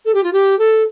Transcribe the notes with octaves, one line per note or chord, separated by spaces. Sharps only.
A4
G4
F4
G4
A4